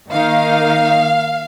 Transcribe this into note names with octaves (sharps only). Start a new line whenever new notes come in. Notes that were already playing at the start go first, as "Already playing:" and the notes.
D#3 A#3 D#4 F5